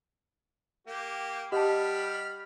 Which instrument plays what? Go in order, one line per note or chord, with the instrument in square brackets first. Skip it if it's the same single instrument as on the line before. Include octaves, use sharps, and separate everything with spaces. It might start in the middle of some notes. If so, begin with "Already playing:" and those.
[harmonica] A#3 G4
[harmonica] G3 B5 F6 [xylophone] G4 A5 [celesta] D#5 F#5 D#6